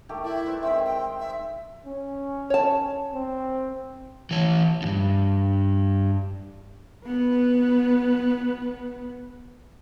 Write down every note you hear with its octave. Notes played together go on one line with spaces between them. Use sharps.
D#3 A3 G4
E4 D5
B4 C5 E5
D#3 G#3 C4 E5
C4 G5
E5
C#4
C#5 A5
C4
E3 C#5
E2 G2
B3 B4